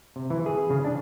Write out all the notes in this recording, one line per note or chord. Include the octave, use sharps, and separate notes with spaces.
C3
E3
G#4
C#3
D4